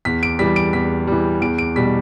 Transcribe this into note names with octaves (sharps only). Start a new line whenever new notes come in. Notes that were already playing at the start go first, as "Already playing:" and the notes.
E2 B6
D7
E3 G3 B6
D7
E2 B6
E3 G3
E2 D7
D7
B2 G3 B6